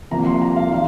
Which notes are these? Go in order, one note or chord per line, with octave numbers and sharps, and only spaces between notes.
C2 C3 F3 A#3 A#5
C6
A#5
F5
D#3 G3 F5